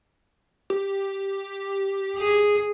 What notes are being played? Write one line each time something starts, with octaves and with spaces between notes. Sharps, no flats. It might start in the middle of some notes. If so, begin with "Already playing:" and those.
G4
G#4